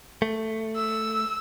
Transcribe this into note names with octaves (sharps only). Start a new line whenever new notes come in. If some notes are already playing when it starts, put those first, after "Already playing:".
A3
E6